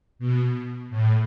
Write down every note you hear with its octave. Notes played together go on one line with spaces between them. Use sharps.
B2
A2